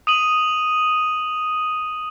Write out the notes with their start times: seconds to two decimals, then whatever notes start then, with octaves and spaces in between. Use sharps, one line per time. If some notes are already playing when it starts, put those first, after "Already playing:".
0.07 D#6 D#7 F#7